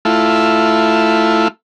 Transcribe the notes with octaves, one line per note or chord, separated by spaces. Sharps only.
A3 E4 F4